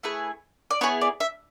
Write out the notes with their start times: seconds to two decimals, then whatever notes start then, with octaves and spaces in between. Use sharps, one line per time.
0.03 A3 E4 G#4 B4
0.71 D5
0.81 B3 E4 G#4 C#5
1.01 D5
1.20 E5